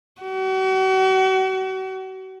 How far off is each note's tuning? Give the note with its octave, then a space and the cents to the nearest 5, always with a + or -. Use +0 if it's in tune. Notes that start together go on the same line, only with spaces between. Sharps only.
F#4 +40